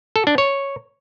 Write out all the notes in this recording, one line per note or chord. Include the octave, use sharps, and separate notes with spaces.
A4
D4
C#5